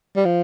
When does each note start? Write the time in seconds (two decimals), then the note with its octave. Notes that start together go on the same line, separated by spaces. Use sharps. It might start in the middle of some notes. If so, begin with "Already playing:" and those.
0.16 G3
0.25 F3